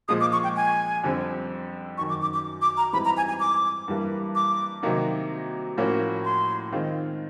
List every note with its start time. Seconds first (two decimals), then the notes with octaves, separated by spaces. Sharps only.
0.08 A#2 F3 G#3 D#6
0.21 D6
0.33 C#6
0.44 G5
0.56 G#5
1.04 F2 D3 G3 C4
1.98 F#2 D#3 F#3 C#6
2.09 D6
2.22 D6
2.34 D6
2.62 D6
2.77 A#5
2.93 G#2 E3 G3 C4 B5
3.05 A#5
3.17 G#5
3.29 G#5
3.40 D6
3.88 G2 E3 G3 A#3
4.35 D6
4.83 C3 D#3 F#3 A#3 D#4
5.77 A2 F3 A#3 C#4 F#4
6.25 C6
6.72 D#3 G#3 C4 F4